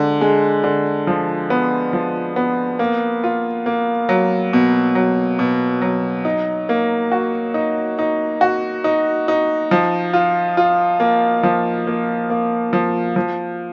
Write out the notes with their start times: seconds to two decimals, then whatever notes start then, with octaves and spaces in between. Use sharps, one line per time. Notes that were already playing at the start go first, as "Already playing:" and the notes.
Already playing: D3 G#3
0.21 G#3
0.64 D3
1.07 F3
1.50 B3
1.93 F3
2.36 B3
2.79 A#3
3.24 F4
3.66 A#3
4.09 F#3
4.53 B2
4.95 F#3
5.39 B2
5.82 F#3
6.25 D#4
6.69 A#3
7.12 F#4
7.54 D#4
7.99 D#4
8.41 F#4
8.84 D#4
9.28 D#4
9.71 F3
10.13 F4
10.57 F4
11.00 A#3
11.43 F3
11.87 A#3
12.30 A#3
12.73 F3
13.16 F3